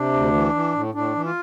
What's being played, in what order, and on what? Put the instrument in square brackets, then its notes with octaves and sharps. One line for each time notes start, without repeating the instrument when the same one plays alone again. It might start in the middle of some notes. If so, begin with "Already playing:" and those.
Already playing: [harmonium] C3 D4
D2
E3
E3
A2
A2 D4
E3
F4